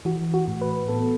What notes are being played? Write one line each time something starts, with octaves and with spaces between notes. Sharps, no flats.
E3 F#4
F#4
A2
B4
B3 A4